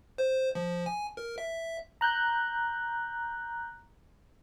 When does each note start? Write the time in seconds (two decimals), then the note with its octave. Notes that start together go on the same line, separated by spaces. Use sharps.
0.18 C5
0.55 F3
0.86 G#5
1.17 A#4
1.38 E5
2.01 A#5 F#6 G6